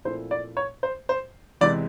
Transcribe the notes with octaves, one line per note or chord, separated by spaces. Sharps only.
A#2 F3 A3 C4 E4 C5
D5
C#5
C5
C5
E2 C3 E3 G#3 D5